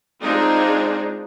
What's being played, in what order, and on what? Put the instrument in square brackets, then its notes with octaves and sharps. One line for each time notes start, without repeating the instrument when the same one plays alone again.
[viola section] G#3 C4 D4 D#4 F4 G#4